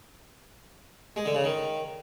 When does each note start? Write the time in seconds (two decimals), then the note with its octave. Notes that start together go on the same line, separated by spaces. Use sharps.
1.16 G#3
1.26 D3
1.35 C#3
1.44 D#3